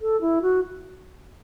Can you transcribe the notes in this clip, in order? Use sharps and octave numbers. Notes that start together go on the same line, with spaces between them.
A4
E4
F#4